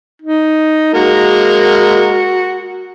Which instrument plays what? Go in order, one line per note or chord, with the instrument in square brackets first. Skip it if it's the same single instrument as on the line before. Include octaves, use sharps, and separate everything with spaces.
[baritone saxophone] D#4
[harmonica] G#3 A#3 A#4 [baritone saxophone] F#4